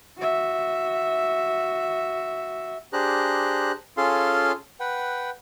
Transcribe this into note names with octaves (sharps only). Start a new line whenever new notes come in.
F#4 E5
D4 G4 G#4 C5 A#5 F#6
C#4 F4 G#4 A4 F5 C6
B4 F#5 G5